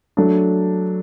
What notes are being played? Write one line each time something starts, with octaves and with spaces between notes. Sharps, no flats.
F#3 A3 D4